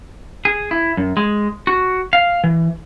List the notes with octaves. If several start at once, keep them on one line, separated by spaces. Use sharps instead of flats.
G#4
E4
F#2
G#3
F#4
F5
E3